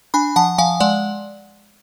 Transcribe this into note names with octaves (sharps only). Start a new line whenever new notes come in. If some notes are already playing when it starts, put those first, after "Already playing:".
D4 G#5 B5
F3 F#5 A5
F3 F5 G#5
G#3 D5 F#5